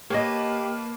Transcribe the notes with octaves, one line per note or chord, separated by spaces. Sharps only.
A#3 G4 B4 C#5 D#5 A5